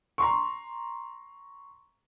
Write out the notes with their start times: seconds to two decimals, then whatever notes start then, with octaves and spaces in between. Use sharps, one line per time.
0.18 A#5 C6 C#6